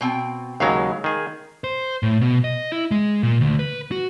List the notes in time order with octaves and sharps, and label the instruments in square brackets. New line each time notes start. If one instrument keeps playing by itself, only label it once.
[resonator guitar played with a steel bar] B2 C4 G5
[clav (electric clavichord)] D#2 C#3 F#3 [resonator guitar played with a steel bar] G#3 F5
[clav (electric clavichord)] D#3 G#4
[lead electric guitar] C5
A2
B2
D#5
E4
G#3
A#2
D2
B4
F#4